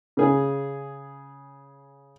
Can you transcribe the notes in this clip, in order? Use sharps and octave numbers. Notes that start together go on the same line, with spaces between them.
C#3 G#4